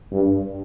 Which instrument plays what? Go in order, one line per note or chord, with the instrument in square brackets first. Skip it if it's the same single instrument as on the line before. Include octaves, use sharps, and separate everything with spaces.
[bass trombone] G2